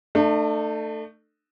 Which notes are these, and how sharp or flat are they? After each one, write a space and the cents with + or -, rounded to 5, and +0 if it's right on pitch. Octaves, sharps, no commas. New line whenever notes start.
A3 +15 D4 +45